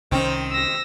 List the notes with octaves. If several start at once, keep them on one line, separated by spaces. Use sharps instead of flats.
C2 D#3 C4 C#4
E6 A#6